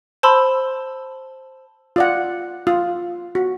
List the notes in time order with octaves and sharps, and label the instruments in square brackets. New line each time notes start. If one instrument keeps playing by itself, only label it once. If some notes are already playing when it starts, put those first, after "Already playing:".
[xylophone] C5 A5 B5 C6 E6
[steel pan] F4 D5 F#5
F4
F#4